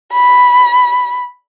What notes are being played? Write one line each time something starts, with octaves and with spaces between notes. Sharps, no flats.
B5